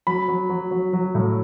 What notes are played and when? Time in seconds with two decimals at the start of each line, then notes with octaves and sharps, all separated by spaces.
0.07 F#3 B5
0.28 F#3
0.49 F#3
0.71 F#3
0.93 F#3
1.15 A2